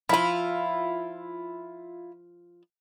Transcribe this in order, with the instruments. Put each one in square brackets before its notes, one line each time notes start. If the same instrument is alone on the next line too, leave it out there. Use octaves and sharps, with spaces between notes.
[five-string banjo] F3 B5 [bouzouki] E4 F4